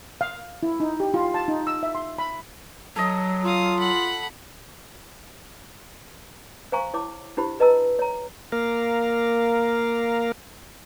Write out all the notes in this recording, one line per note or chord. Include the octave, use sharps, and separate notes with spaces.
F5
E4
D#4
G4
F4
A5
D#4
E6
E5
C6
B5
F#3 A4 D#5
F4 F5 D#6
F#5 B5
C5 F5 G#5 A#5 C#6
E4 C#5 D6
D4 E4 G4 C5 B5
B4 D#5 A5 A#5 E6
C#5 A#5
A#3 A#4 F5